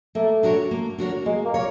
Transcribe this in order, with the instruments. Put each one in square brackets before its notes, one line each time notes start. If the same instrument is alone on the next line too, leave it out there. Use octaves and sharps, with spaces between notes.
[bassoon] A3 [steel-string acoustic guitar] A#3
[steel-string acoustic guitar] D4 F#4 A#4 C#5
A#3
D4 F#4 A#4 C#5
[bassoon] G#3 [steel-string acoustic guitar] A#3
[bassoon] A#3
[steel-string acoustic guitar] A#4 C#5